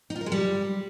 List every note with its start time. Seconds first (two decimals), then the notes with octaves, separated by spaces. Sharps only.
0.10 D#4
0.16 F4
0.21 A#4
0.26 G#3
0.32 G3